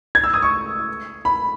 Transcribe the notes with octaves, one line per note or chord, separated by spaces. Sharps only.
G#6
E6
D#6
C#6
B5